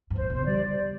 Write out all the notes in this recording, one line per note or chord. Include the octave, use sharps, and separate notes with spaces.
G2
A2 C5
B2 C5
G3 D5